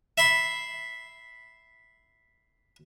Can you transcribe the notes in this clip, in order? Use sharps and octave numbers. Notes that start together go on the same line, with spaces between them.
E5 B5 C6